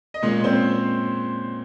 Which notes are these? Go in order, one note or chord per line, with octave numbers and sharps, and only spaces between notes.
D#5
A#2 G#3 C#4 C#5
C4 C5